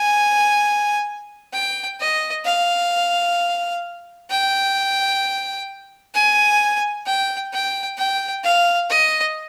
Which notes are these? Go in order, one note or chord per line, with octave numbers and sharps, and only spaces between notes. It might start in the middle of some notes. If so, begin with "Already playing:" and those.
Already playing: G#5
G5
D#5
F5
G5
G#5
G5
G5
G5
F5
D#5